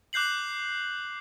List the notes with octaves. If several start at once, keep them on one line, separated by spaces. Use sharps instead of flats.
D6 F#6 G6 C7 F#7